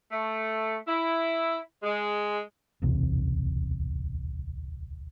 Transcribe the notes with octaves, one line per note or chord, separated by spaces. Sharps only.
A3
E4
G#3
D1 B1 E2 C3